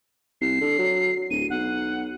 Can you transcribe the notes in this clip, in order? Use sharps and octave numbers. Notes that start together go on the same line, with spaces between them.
C2 C7
D3
F#3
D1 D#7
B1 F#5